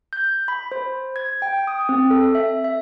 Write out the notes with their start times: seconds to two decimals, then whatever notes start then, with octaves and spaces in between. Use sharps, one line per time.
0.13 G6
0.48 B5
0.72 C5
1.16 G#6
1.42 G5
1.67 D#6
1.89 C4
2.11 A4
2.35 E5
2.64 E5